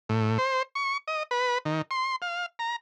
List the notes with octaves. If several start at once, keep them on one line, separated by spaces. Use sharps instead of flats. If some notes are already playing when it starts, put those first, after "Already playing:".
A2
C5
C#6
D#5
B4
D#3
C6
F5
A#5